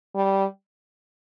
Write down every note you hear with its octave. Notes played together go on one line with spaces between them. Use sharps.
G3